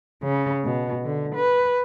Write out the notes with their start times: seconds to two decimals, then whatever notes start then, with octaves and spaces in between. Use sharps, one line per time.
0.23 C#3
0.64 B2
1.05 D3
1.35 B4